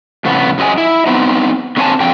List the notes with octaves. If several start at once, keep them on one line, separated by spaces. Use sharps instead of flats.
F2 A2 C#3 B3
F#2 F#3 D#5 G#5
E4
B3 C4 D#4
D3 C4 C5 C#5 G#5 A5
F2 D3 G5